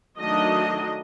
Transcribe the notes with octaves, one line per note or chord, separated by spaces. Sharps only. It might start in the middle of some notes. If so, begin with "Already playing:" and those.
D#3 F#3 A3 D4 D#5